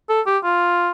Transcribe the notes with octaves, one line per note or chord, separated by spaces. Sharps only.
A4
G4
F4